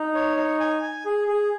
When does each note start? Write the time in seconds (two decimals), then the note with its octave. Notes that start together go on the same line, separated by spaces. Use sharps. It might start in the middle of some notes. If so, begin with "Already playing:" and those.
Already playing: D#4
0.15 C#5
0.37 D#4
0.60 G#5
0.82 G#5
1.05 G#4
1.28 G#4